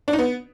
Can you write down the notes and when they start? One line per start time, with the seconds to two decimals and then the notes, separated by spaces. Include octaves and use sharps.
0.08 D4
0.13 D#4
0.19 B3